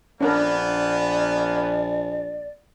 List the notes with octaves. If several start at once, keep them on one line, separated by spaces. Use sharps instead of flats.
A#1 A#3 B3 C#4 D4 A#4 D5